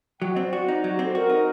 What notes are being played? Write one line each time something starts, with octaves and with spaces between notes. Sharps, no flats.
F#3 G5
D#5
C4
D5
F#4 D5
D#4
F#3 F#4
C4 G4
A4
F#4 A#4
D#4